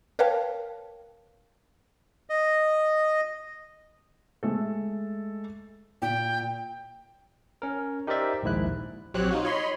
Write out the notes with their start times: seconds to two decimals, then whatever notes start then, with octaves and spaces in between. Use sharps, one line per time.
0.19 A#4 B4 C#5 F5 G5 A5
2.30 D#5
4.43 G#3 A3 A4
6.02 A#2 G5
7.62 C#4 A#4
8.07 D#4 G4 A#4 C5 D5 E5
8.43 A#1 D#2 G#2 E4 F#6
9.14 A#1 F#3 C4 G4 C#5 F#6
9.31 D#4 F4 F#4
9.45 C#5 D#5 B5 C6